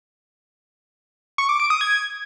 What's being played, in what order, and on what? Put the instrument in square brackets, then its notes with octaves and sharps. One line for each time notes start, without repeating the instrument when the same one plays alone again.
[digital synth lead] C#6
D6
D7
D#6
G#6